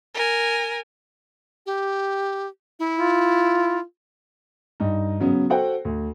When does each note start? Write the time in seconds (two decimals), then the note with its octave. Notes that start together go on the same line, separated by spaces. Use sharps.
0.14 A#4 G#5
1.66 G4
2.79 E4
2.98 F4
4.80 G2 D#4
5.20 C#3 F#3 B3 C#4
5.50 F#4 A4 C5 F#5 G5
5.85 D2